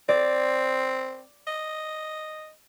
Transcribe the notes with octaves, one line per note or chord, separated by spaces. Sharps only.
C4 D5
D#5